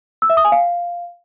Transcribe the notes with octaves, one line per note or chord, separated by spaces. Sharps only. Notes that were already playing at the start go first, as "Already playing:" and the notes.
E6
E5
D#6
G#5
F5